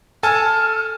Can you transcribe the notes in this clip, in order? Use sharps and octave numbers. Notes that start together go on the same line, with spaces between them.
A4 G#5 A5 F6